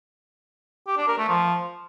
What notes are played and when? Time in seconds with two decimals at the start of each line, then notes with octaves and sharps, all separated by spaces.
0.87 G4
0.97 D4
1.08 A#4
1.18 A3
1.28 F3